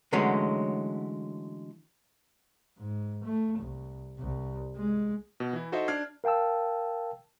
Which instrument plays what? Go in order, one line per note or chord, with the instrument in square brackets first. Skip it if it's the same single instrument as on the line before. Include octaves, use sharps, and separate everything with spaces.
[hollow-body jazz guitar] D3 E3 F#3 G#3 A3 C#4
[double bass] G#2
A3
C2
C2
G#3
[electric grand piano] B2
E3 E4
D#4 F#4 A4 C5 D#5 E5
D4 D5 F6 G#6 C7
[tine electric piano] A#4 F5 G5 A5 E6